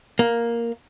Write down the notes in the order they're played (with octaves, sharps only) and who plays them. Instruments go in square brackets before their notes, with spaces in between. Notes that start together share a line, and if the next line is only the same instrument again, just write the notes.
[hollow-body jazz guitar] A#3